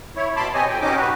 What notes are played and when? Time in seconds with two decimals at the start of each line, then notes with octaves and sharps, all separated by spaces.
0.16 E4 C#5
0.36 B2 A5 B5 C6 D6
0.54 C4 G4 C#5 D#5 G#5
0.68 F2 G5
0.81 B2 C#4 D#4 G4 D#5 D6
0.96 F#4 G4 B4